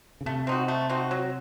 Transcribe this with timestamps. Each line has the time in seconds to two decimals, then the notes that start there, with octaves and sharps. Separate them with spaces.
0.21 C#3
0.26 C3 A3
0.47 C4 D#4 F#4
0.68 A3
0.90 C4 D#4 F#4
1.11 F#3